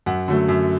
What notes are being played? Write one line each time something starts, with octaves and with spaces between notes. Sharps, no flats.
F#2 F#5
D3 F#3 A3
F#2